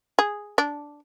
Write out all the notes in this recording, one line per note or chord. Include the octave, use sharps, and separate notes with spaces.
G#4
D4